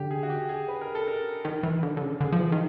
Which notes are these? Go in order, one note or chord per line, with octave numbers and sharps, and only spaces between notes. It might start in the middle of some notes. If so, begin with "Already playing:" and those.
Already playing: D3 G4
G#4
F#4
G4
G#4
B4
A#4
A4
A#4
D#3
E3
D3
D3
C#3
D3 G#4
F3
E3
D#3